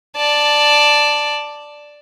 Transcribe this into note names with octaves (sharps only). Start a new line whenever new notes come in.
D5 A5